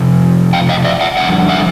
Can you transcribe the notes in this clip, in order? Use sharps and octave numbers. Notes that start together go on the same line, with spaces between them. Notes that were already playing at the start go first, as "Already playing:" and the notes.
Already playing: F2 C3 F3
F5 G5
D#5 F5
D5 E5
E5 F#5
F2 D3 G3 E5 F#5
E5 F#5